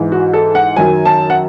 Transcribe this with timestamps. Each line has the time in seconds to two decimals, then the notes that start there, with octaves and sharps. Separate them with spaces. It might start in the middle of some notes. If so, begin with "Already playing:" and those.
Already playing: G#2 E3
0.12 F#4
0.33 A4
0.55 F#5
0.76 F#2 D#3 F#3 G#5
1.05 A5
1.30 F#5